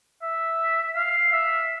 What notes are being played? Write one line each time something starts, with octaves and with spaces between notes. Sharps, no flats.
E5
F5
E5